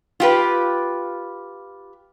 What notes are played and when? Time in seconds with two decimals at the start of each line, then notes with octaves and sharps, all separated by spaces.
0.20 F4 G4 B4